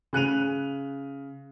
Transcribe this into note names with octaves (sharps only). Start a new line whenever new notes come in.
C#3 F#6 D#7 F7